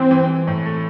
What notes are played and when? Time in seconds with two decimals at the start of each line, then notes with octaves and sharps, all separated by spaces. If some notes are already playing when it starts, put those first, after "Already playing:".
Already playing: E3 C4
0.11 E3
0.29 E3
0.47 A2
0.65 A3